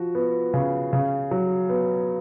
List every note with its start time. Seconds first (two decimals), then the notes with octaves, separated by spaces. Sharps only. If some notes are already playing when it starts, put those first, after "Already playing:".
Already playing: F3 F#4
0.15 B3
0.54 C#3
0.93 C#3
1.31 F#3
1.69 B3